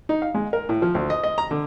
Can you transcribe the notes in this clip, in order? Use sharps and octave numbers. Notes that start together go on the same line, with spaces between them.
D#4
F5
G#3
A#4
A2
F3
D2
D#5
D#5
A#5
D3